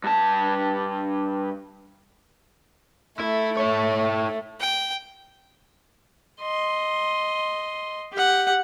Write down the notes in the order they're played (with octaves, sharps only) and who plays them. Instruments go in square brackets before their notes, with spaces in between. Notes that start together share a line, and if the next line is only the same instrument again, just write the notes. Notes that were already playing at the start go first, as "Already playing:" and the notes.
[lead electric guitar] G2 A5
[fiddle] A3 [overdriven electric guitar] E4
[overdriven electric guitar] E4 C#5
[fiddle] G5
[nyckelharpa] D#5 C6
G4 F#5